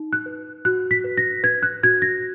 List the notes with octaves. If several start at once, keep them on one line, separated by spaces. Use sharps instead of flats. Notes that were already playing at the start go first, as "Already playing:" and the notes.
Already playing: D#4
F#6
B4
F#4 F#6
B6
B4
A#6
B4 G#6
F#6
F#4 G#6
A#6